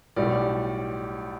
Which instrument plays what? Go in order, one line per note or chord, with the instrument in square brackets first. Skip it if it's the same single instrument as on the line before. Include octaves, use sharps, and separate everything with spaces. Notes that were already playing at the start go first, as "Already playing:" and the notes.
[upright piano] B1 A2 G3 D5